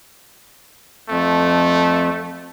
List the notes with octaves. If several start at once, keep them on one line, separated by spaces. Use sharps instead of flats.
F2 A3